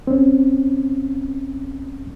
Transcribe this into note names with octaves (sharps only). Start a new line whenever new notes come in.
C4 C#4